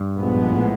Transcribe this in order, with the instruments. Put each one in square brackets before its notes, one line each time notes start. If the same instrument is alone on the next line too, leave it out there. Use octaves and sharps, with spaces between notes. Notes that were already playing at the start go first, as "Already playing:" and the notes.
Already playing: [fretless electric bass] G2
[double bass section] A#1 G#2 F3 G#3 B3
[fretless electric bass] A2